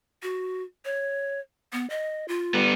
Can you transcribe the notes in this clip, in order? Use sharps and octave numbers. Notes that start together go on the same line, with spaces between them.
F#4
C#5
B3
D#5
F4
G3 B3